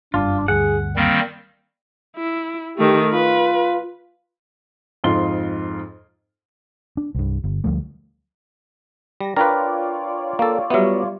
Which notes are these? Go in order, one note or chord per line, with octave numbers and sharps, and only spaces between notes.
F#1 G2 D4 F4
D2 G2 G#4 F#5
D#3 G3 A#3 C4
E4
D#3 A3 G4
F4 B4
F2 G#2 F4 C6 G7
D4
C2 G2
G1
D2 F3 G3 A3
G3 A#6
D4 F4 A#4 B4 C#5 D5 G5 A#5
A#3 A4 F5
F#3 G3 B3 G4 E5